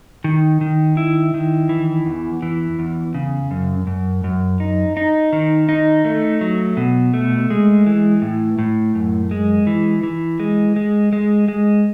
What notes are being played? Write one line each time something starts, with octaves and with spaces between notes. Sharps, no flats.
D#3
D#3
E4
D#3
E3
E2
E3
E2
C#3
F#2
F#2
F#2
D#4
D#4
D#3
D#4
A3
F#3
B2
A3
G#3
E3
A2
A2
F#2
G#3
E3
E3
G#3
G#3
G#3
G#3